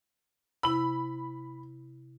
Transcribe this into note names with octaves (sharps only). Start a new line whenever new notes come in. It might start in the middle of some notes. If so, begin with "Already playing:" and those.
C3 E4 B5